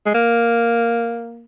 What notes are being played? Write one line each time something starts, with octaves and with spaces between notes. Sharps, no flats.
G#3
A#3